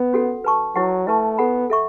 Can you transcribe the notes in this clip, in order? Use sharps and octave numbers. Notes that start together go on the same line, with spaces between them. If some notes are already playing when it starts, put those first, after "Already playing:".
Already playing: B3
C#4 F#4 A4 F#5
B4 A5 C#6
F#3 E4 B4 F#5 C#6
A3 E4 B4 A5 C#6
B3 A4 F#5 B5
A4 E5 C#6